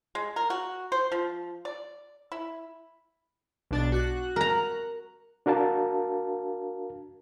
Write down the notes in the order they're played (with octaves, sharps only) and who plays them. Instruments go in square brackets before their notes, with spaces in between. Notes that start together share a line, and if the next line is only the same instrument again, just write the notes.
[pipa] G#3
A#4
F#4
C5
F3
D5
E4
[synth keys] B1 D4 A6
F#4 F#6
[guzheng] A#4 A#5
[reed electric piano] D4 F#4 A#4 F5 A5